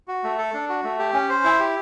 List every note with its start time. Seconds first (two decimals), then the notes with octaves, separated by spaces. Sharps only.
0.08 F#4
0.24 A3
0.38 A4
0.54 D4
0.69 F#4
0.84 A3
0.99 G4
1.14 C#4
1.29 C5
1.44 E4
1.59 G4